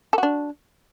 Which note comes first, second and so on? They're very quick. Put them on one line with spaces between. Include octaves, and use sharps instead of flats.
A4 F#4 D4